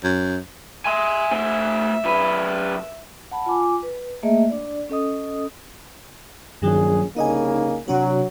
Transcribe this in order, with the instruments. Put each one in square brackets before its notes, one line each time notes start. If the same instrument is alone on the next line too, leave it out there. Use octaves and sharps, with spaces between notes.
[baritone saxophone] F#2
[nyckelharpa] E5 [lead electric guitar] G#5 C6
[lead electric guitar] A3 C5
F#2 B4
[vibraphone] F#5 A5 B5
F4 G#5 D6
B4
A3 A#3 G#4 D#5 E5
D4 D5
C#4 A4 D#5 D#6
[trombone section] A#1 C#4 G#4 [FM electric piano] G2 D#3 F#3
[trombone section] C2 C#3 A#3 [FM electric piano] D#4 D#5 G#5
[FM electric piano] C3 D4 F#4 [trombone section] F#3